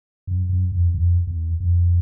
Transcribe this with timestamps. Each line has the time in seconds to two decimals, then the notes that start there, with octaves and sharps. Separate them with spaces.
0.27 F#2
0.49 F#2
0.72 F2
0.87 E2
0.94 F2
1.27 E2
1.60 F2